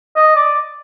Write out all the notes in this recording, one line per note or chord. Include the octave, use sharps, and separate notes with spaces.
D#5
D5